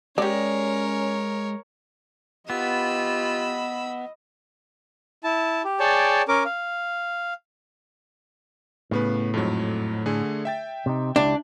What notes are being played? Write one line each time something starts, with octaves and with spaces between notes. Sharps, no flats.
G#3 C#4 G4 A#4 C#5 D5
B3 F4 G4 D#5 B5 E6
E4 A5
G4
G#4 C#5 D5 G5 A5
C#4 A#4 D6
F5
A2 C#3 B3 B4
F2 G#2 F#3
D3 A3 G#4
E5 G5 A6
C3 D#4
C#2 D4 E4 G4